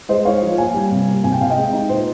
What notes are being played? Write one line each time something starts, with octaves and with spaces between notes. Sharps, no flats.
G#3 C5 D#5
D#4 C#5 F5
F3
A#3 F5 G#5
G3
C3
A#3
C3 G#5
G5
C3 F5
D#5 G5
G#3
D#4
A#2 C5